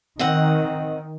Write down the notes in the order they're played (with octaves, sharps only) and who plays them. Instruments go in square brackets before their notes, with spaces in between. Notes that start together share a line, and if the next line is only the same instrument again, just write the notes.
[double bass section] D#3 [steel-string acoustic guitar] C4 D#5 F#5